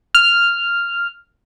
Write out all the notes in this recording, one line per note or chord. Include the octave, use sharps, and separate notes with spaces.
F6